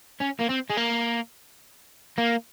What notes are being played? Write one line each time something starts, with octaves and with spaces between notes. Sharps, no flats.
C#4
A#3
C4
G#3
A#3
A#3